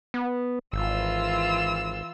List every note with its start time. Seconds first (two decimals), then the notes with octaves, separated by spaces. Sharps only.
0.14 B3
0.73 G#1 E3 F4 E6